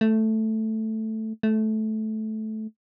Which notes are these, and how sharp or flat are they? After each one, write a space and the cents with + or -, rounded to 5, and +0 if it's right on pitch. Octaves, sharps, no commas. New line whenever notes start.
A3 +0
A3 -15